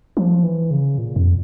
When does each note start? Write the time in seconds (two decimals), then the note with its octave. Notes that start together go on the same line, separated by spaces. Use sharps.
0.17 F3
0.43 E3
0.71 C#3
0.98 A#2
1.16 F2